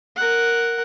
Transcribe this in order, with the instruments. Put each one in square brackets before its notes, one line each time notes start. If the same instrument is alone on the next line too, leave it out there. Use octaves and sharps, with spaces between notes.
[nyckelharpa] A#4 F#5